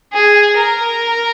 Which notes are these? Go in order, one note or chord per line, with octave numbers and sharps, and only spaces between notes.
G#4
A#4